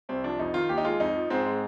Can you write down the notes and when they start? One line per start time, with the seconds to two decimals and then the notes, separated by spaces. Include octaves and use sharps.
0.09 C2 C4
0.24 F3 D4
0.39 F2 D#4
0.54 D#3 F4
0.69 D#2 G4
0.78 D#4
0.85 G#3 F4
1.00 F2 D#4
1.15 F3
1.30 G#2 C4
1.46 G#3